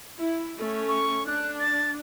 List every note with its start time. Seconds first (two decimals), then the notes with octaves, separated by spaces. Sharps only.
0.19 E4
0.57 A3 C#4
0.88 C#6
1.27 D4 F#6
1.59 A6